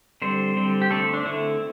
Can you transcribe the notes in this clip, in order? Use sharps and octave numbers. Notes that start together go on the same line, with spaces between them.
D3 G3 C4 C5
D3 G3 C4
G4
D3 A3 C4 A4
D4
D3 A3 C4 E4